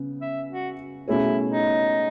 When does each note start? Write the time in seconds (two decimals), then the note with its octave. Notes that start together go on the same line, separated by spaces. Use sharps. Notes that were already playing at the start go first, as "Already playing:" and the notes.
Already playing: C#3 B3
0.22 E5
0.50 F#4
1.07 B2 A3 C#4 E4 G#4 C#5
1.50 D#4